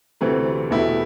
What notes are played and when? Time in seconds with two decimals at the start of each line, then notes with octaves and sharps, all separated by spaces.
0.21 D2 C3 E3 A3 C4
0.71 E2 B2 A3 E4 G4